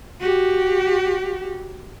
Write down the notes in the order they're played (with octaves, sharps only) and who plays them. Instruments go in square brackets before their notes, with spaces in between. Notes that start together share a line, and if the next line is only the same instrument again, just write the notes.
[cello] F#4 G4